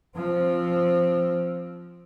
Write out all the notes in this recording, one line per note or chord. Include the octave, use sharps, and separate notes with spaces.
F3 C4